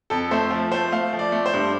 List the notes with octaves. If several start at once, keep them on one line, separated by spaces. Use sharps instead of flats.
F2 A4
A3 C5
F3
A3 C5
A3 F5
F3
D5
A3
C5
G2